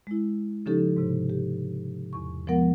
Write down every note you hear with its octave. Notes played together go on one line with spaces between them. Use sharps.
G#3 E4
C#3 F3 C#4 D#4 G4 A4
G#2 C3
G4
E2 C#6
F3 G#3 B3 A#4 F#5